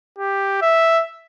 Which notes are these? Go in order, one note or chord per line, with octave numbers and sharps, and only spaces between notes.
G4
E5